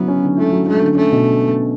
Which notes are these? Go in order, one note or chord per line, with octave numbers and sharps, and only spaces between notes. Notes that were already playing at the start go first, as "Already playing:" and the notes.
Already playing: C#3 F#3 B3 E4
C#4
D3
A3 E4
F#3
A3 C#4
D3
A3 C#4
B2